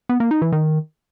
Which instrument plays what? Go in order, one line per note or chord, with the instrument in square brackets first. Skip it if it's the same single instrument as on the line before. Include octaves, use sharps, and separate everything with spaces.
[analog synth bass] B3
A#3
D#4
E3
D#3